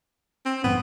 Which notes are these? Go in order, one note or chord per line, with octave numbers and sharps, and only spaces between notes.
C4
A1 G2 B3